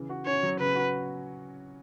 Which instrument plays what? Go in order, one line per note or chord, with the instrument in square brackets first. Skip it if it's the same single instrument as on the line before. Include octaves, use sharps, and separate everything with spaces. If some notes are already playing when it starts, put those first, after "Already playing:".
Already playing: [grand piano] C#3 E3
F#4
[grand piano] C#4 [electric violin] C#5
[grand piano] F#3
[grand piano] C#3 [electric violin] B4
[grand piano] F#4